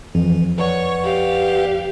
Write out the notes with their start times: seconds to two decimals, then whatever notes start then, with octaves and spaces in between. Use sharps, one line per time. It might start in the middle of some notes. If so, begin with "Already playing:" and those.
0.15 F2 E3
0.58 B4 C#5 D5 F#5 C#6
1.03 G4 F5